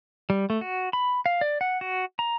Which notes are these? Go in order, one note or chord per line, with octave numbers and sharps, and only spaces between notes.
G3
A3
F#4
B5
F5
D5
F#5
F#4
A#5